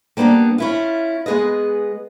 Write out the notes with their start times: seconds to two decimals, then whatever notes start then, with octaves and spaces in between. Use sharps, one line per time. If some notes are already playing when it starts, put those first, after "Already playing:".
0.17 G3 A#3 B3 C#4 D4
0.58 C#4 E4 F4
1.26 G#3 B3 G#4 B4 D#5